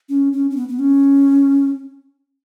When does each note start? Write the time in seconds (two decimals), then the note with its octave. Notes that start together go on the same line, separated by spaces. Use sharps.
0.09 C#4
0.33 C#4
0.50 C#4
0.57 B3
0.68 B3
0.79 C#4